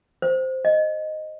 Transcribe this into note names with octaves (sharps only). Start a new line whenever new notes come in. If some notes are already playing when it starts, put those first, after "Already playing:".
C5
D#5